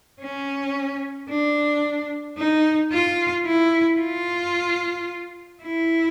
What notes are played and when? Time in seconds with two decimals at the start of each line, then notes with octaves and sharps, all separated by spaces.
0.21 C#4
1.29 D4
2.38 D#4
2.92 F4
3.46 E4
4.00 F4
5.63 E4